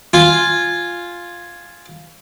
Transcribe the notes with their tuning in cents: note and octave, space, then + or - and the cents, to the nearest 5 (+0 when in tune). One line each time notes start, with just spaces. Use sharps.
F4 +0 G#5 +0